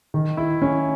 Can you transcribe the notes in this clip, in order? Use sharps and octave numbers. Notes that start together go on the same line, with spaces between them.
D#3
E4
C#4